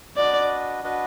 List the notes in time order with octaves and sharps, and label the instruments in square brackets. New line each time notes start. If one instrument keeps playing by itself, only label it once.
[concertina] D4 F#4 B4 D#5 [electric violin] D5
[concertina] D4 F#4 B4 D#5